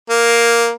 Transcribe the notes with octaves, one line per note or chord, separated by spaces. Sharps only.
A#3